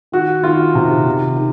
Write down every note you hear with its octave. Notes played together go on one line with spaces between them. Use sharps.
D#3 F#4
D#3 F4
C3
D#3
D#3